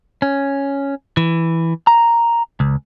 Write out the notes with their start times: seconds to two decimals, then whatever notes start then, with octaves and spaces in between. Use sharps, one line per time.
0.22 C#4
1.17 E3
1.87 A#5
2.60 C#2